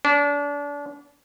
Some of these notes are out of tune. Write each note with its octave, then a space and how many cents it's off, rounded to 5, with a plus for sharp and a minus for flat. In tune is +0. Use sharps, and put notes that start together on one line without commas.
D4 -30